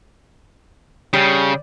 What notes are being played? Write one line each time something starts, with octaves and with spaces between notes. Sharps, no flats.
C#3 G3